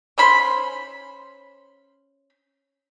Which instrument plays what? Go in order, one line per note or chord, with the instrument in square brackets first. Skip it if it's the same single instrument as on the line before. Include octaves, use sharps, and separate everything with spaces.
[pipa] C#4 C5 B5 C6